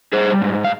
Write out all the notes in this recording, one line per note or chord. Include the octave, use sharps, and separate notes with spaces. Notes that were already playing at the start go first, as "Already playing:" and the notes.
G3 G#4 C5
G#2
F5